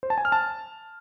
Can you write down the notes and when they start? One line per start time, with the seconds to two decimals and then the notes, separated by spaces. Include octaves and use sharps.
0.03 C5
0.10 A5
0.18 G#5
0.25 F6
0.32 A5